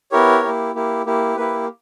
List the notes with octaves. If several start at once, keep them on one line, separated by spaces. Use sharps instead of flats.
B3 E4 G4 A#4 C#5
A#3 E4 G4
A#3 E4 G4
A#3 E4 G4
A#3 E4 G4 B4